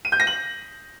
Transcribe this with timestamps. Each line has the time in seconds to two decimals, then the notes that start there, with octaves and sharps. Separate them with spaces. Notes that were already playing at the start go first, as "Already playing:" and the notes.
0.05 D#7
0.12 G6
0.20 A#6
0.27 F#7